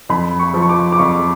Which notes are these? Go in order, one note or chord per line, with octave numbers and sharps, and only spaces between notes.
F2 B5
C#6
F3
C#6
D6
D6
F2 C#6